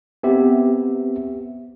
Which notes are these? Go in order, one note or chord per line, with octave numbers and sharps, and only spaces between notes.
B3 C4 G4 E5